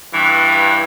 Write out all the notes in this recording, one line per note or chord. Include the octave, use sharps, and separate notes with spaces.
G2 E3